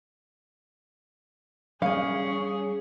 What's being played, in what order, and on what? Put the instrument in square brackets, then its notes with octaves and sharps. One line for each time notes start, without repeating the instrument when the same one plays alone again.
[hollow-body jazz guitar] G3 G#5 [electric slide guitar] C#4 [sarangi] G#4 [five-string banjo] F5